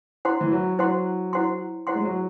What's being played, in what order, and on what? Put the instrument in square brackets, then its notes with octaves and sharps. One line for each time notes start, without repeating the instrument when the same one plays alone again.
[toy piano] E4 C5 F#5 C6
[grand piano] E3
F#3
[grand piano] F#3 [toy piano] E4 C5 F#5 C6
[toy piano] E4 C5 F#5 C6
E4 C5 F#5 C6
[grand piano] G#3
F#3